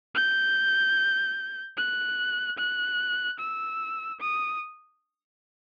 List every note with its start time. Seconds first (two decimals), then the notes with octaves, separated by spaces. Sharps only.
0.15 G6
1.77 F#6
2.58 F#6
3.39 E6
4.20 D#6